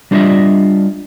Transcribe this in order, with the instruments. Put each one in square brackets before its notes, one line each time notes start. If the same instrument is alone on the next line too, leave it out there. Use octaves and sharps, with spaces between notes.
[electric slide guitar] G3 D4 F4 C5 D#5 E5